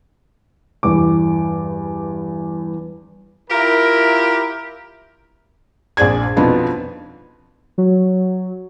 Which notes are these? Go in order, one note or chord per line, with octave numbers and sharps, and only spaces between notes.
E2 G2 E3 D6
E4 F4 G4 A#4
A#1 C4 G#4 D5 G#6
F2 B2 F3 B3 D4 D#4
F#3